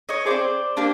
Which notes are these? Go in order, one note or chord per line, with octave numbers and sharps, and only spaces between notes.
C#5 D#5
E4 G#4 C5 D5
C4
A#3 D4 G4